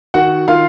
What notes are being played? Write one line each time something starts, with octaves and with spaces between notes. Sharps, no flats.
D#3 F#4 F#5
D#3 F4 F5